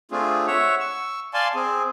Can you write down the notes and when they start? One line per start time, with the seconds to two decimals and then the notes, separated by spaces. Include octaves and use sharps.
0.11 A3 C4 D4 F4 G#4
0.47 C#5 E5 F#5
0.80 C#6 E6
1.34 D5 F5 G#5 A5 C6
1.55 C4 G#4